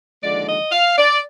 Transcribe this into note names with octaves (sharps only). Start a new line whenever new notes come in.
D#2 D3 F3 G#3 D5
D#5
F5
D5